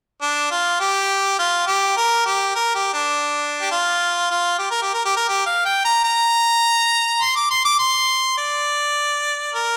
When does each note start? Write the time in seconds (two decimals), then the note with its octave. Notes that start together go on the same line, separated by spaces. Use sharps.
0.22 D4
0.51 F4
0.80 G4
1.39 F4
1.67 G4
1.97 A#4
2.26 G4
2.55 A#4
2.75 G4
2.93 D4
3.62 G4
3.71 F4
4.30 F4
4.59 G4
4.71 A#4
4.82 G4
4.94 A#4
5.05 G4
5.17 A#4
5.28 G4
5.46 F5
5.65 G5
5.85 A#5
6.04 A#5
7.21 C6
7.36 D6
7.50 C6
7.65 D6
7.79 C6
8.37 D5
9.54 A#4